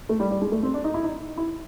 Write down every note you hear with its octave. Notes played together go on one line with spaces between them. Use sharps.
A3
G3
G3
G#3
A3
C4
D4
D#4
E4
D#4
E4